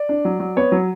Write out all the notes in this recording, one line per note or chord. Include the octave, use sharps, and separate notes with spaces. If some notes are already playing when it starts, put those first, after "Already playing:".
Already playing: D5
D4
F#3
F#3
B3 C#5
F#3